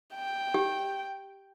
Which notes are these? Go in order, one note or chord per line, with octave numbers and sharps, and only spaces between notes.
G5
G4